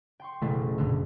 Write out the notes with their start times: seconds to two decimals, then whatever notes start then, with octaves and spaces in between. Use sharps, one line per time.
0.20 G5 C6 C#6
0.42 F#1 B2 E3 A3
0.78 F#2 A#2 D3